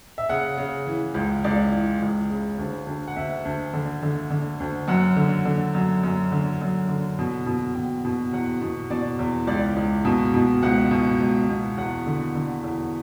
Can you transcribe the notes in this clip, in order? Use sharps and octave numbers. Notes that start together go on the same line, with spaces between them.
E5
C#3 F#5
C#3
E3
C#2
C#2 D5
E3
C#2
C#3
D2
D2
F#5
D2 E5
D2
D3
D3
D3
D2
F#2 F#5
D3
D3
F#2
F#2
D3
F#2
D3
B2
B2
B2 G5
B2
E2 F#5
B2
B2 D5
E2
C#2 D5
C#2
B2
B2
C#2 F#5
B2
C#2
B2
E2 F#5
D3
D3
E2